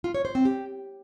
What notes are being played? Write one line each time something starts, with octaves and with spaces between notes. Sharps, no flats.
F4
C#5
C5
C4
G4